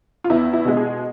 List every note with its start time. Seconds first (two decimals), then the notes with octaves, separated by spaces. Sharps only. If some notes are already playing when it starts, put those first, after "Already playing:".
0.24 F4
0.30 E2 E4
0.53 E4
0.65 B2 G#3
0.77 G#4